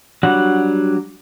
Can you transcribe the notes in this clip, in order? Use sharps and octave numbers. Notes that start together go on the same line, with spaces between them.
F#3 G3 D4 F#4 F#5